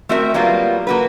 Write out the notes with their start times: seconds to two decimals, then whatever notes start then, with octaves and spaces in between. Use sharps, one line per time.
0.09 A3 C4 F#4 A#4 E5
0.34 F#3 G3 A#3 B3 F4
0.87 A#3 F#4 B4